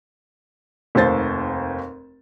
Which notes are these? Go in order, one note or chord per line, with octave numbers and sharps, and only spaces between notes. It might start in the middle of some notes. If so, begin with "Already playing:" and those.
F1 D#2 C5 A6